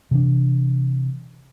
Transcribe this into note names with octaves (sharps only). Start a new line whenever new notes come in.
C3 E3 D4